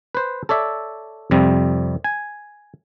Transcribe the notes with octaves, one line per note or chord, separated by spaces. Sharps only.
B4 C5
A4 C#5 D5 E5
F2 C3 G3
G#5